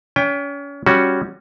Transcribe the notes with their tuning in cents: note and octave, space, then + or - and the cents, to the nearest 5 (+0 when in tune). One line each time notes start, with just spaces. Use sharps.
C#4 +35 G5 +30
G3 +0 C#4 +0 F#4 +0